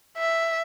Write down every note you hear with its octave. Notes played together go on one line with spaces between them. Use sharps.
E5